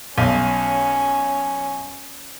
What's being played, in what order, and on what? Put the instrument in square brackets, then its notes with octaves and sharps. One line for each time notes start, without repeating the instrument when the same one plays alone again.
[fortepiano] B1 [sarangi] C#4